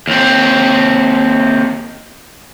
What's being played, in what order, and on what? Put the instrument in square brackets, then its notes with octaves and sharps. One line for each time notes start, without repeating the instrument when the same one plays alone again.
[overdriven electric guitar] D#2 C4